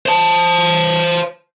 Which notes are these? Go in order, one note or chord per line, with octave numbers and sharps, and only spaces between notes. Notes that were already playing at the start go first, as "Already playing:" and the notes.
C5 A5